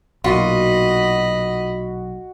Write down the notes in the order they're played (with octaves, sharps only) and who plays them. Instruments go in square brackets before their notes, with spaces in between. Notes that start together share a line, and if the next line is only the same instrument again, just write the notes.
[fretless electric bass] B1 A#2 [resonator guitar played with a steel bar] F4 [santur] F#4 [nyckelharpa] D#5 B5